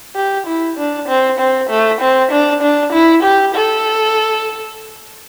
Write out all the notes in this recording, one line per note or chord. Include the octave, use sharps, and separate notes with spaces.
G4
E4
D4
C4
C4
A3
C4
D4
D4
E4
G4
A4